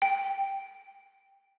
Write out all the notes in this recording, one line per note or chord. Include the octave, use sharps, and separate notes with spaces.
G5